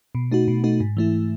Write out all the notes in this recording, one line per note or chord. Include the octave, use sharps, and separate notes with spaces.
B2
A3 D#4 F#4
B2
A3 D#4 F#4
G#2
E3 A3 E4